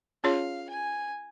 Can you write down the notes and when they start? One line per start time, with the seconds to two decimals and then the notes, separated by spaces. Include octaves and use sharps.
0.24 C#4 F4 G#4 C#5 F5
0.69 G#5